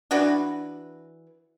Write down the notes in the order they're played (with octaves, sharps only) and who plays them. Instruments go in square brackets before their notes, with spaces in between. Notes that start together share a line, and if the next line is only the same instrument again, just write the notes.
[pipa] E3 D4 F#4 B4